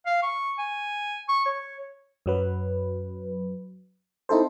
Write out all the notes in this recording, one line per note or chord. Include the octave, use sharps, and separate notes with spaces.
F5
C#6
G#5
C#6
C#5
F#2 F#3 B4
C4 D#4 E4 A4 C5